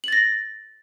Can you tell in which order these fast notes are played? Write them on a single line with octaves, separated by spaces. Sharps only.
F#7 A6 A#6